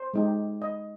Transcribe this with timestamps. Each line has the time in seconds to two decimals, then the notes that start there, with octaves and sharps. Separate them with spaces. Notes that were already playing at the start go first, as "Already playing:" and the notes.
Already playing: C5
0.14 G#3 D#4 G4
0.62 D#5